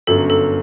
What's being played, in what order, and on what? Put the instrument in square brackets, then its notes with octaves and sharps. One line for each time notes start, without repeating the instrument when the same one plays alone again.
[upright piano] G1 F#2 F#3 [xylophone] A4
[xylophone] A4